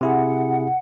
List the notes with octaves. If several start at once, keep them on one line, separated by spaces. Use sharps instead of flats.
C3 E4 G#4 F#5